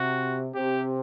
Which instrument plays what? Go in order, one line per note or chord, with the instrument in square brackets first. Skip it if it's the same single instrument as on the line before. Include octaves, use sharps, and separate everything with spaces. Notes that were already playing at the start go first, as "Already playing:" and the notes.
Already playing: [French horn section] C3 [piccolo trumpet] F#4
[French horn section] C3 [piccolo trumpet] G4